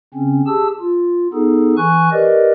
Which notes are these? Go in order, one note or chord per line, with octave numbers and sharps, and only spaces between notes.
C#3 C4 C#4
G4 G#4 A5 E6
F4
B3 D#4 G#4 A4
E3 G#5 C#6 F#6
G4 A#4 B4 D5 D#5